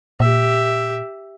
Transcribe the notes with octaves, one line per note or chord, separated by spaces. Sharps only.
A#2 G4 E5